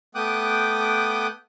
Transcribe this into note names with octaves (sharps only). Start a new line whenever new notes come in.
A3 B3 G5 D6 D#6 F#6